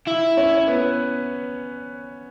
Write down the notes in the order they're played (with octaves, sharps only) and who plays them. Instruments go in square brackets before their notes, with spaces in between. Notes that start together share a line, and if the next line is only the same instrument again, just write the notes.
[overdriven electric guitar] E4
[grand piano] C#4 C#5
B3 B4